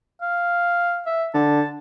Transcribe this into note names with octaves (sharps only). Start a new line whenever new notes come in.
F5
E5
D3 A5